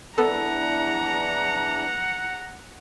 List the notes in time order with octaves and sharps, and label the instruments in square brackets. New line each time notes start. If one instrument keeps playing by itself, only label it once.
[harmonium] E2 E3 D4 [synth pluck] B3 A4 [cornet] F#5 [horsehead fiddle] A#5